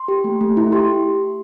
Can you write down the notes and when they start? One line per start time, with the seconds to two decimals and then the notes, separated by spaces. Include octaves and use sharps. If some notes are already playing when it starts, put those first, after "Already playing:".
Already playing: C6
0.08 G4
0.24 A3
0.41 A3
0.57 E4
0.72 G4 C6